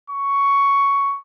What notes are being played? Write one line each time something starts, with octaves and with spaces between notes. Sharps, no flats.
C#6